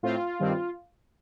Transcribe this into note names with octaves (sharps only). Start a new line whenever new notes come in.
A2 A3 C4 F4
G2 D#3 G3 C4